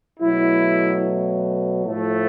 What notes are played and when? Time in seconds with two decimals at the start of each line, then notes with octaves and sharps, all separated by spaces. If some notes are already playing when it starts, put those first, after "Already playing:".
0.20 B2 F#3 A3 E4
1.84 A2 F3 A3